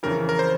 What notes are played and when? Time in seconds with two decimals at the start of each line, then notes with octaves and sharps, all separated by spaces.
0.03 F2 C#3 E3 A#4
0.29 A#4
0.39 C5